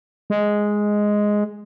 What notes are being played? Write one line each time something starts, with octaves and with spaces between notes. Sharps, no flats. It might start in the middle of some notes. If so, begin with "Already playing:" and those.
G#3